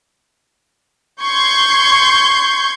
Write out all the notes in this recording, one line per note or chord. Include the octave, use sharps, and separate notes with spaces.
C6 C#6 G6 G#6